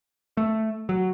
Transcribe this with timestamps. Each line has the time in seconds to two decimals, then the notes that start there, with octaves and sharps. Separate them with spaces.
0.37 A3
0.89 F#3